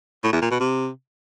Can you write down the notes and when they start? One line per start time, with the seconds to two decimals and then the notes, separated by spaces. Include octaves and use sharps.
0.24 A2
0.33 E2
0.42 A#2
0.51 B2
0.60 C3